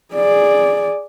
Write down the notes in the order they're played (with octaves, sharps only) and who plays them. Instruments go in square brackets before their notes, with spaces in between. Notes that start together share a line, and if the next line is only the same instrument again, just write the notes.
[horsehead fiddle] G#4 D5